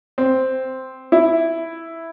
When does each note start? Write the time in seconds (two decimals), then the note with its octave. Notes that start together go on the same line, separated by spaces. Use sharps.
0.18 C4
1.12 E4